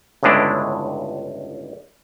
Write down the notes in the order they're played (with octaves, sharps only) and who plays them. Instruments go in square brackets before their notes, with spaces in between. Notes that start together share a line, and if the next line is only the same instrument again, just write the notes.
[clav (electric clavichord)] G1 C#2 A2 G#3 D4 E4